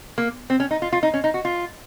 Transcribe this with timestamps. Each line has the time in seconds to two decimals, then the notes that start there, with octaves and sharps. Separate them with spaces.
0.18 A#3
0.50 C4
0.60 C#4
0.71 D#4
0.82 F4
0.93 F4
1.03 D#4
1.14 C#4
1.24 D#4
1.34 F#4
1.45 F4